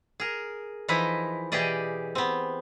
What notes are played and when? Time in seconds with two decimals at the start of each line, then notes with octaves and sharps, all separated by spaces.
0.20 G#4 A#4
0.88 E3 F3 D#4 E4 D#5
1.52 B2 E3 G4 G#4 D5 D#5
2.15 B3 C4